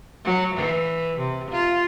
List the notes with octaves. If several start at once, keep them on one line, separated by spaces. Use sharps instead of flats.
F#3
E3
C3
F4